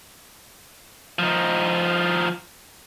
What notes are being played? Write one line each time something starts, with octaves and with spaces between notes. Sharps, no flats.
F3 D#4